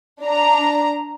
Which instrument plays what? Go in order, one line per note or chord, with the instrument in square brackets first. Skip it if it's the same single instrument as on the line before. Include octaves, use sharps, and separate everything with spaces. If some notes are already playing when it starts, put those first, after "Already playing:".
[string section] D4 A#5